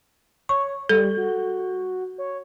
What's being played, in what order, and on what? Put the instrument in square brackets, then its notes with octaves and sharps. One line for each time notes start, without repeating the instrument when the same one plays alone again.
[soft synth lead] C#5 [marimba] C#6
[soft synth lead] G3 [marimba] A4
[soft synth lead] F#4
C#5